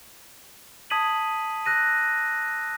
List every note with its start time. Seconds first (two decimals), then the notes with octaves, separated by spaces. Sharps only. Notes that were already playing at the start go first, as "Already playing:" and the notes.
0.90 A5 D#6 G#6 B6 D#7 F#7
1.66 E6 F#6 A#6 D#7